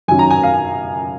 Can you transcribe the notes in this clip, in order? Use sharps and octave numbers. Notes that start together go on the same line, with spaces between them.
F#2 D#3 F#3 C#4 G#5
A#5
G#5
F5